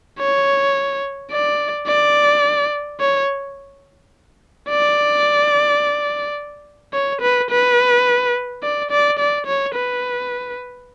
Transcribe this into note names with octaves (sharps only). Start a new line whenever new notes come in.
C#5
D5
D5
C#5
D5
C#5
B4
B4
D5
D5
D5
C#5
B4